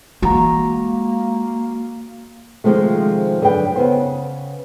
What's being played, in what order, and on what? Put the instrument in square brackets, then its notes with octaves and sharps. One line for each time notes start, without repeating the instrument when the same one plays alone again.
[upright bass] E3 G#3 [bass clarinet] A#3 [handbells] F#4 A#5
[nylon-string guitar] C3 D#3 F3 G#3 A3
F#2 D3 G#4 B4 G5
C#3 B3 C5